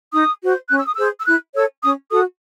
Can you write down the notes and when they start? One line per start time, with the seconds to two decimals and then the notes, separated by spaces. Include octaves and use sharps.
0.13 D#4 D#6
0.41 F#4 C5
0.69 C#4 F#6
0.77 E6
0.86 D#6
0.95 G#4 C5 E6
1.19 E6
1.25 E4 F#6
1.54 A4 C#5 E6
1.82 C#4 D#6
2.10 F#4 A4 D#6